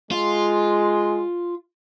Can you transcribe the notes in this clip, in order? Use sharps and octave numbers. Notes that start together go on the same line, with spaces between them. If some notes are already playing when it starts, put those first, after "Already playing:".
G#3 F4